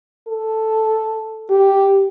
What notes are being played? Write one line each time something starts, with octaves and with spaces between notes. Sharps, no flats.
A4
G4